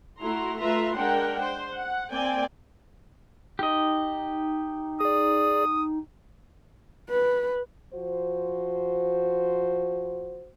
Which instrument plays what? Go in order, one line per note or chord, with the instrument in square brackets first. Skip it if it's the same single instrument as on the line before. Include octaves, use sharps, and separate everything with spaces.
[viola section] A3 E4 F#4 A#5 C6
A3 F4 B4 E5 A#5 C6
G#3 D4 A#4 F#5 G5
C5
F#5
A#3 C4 D5 G5 G#5
[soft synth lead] D#4 [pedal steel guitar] G4 D#5
[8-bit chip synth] G#4 D5 [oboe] D#6
[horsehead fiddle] B4
[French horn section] F3 F#4 C5